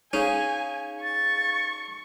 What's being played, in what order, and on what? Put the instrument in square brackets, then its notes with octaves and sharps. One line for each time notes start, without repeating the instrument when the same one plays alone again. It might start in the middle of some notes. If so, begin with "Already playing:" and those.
[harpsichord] C#4 [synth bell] D#4 G#4 F5 [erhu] G#5
[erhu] C#6 [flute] A6